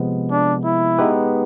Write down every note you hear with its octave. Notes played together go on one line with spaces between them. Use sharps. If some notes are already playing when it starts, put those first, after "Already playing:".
Already playing: C3 F3 G#3 B3
D4
E4
G#3 B3 D#4 G4 B4